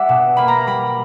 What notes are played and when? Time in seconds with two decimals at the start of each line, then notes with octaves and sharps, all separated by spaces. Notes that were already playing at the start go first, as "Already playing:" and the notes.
Already playing: G3 D5 E5 F#5
0.09 B2
0.37 A#3 B5
0.48 A#5
0.67 G3 B5